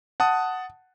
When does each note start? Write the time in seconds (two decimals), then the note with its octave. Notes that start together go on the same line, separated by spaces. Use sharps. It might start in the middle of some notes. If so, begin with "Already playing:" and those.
0.20 F#5 A5 D#6